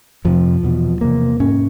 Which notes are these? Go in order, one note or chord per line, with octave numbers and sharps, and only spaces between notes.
F2 C3 F3
E2 B2
E2 C3 A#3
G#2 C#4